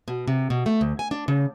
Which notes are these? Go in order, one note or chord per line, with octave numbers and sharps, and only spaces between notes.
B2
C3
B2
A3
D2
G#5
D4
C#3